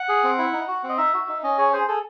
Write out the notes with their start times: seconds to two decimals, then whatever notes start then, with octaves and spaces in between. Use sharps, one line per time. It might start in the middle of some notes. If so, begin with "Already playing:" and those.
Already playing: F#5
0.09 G#4
0.24 C4
0.38 E4
0.53 D#4
0.68 F#4
0.83 C4
0.89 D#5
0.98 D#4 E5
1.14 F#4
1.28 D#4
1.43 C#4 D#5
1.58 G#4 C#5
1.73 G#4 C5
1.88 G#4 A4